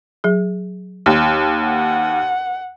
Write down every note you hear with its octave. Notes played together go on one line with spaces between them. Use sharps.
F#3 G#4
D#2
F#5